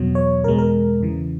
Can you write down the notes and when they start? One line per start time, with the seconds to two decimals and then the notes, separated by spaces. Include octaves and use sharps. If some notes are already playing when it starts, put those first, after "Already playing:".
Already playing: E2 B2 F#3
0.15 C#5
0.44 E2 B2 G#3 A#4
0.58 A#4
1.01 E2 C#3 E3